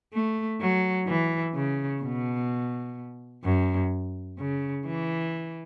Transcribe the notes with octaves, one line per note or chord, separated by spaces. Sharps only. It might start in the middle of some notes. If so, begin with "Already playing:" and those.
A3
F#3
E3
C#3
B2
F#2
C#3
E3